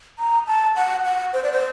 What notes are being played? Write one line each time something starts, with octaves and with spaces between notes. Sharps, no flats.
A#5
A5
F#5
F#5
C5
D5
C5